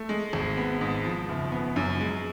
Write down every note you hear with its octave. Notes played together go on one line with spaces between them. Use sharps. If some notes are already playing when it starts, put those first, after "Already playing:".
Already playing: A3
G#3
G#1
B3
G#2
F3
F#1
B3
F#2
G#3